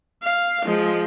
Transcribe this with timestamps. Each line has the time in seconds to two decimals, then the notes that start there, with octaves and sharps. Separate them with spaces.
0.22 F5
0.65 F3 G#3